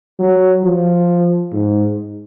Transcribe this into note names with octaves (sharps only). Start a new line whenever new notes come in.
F#3
F3
G#2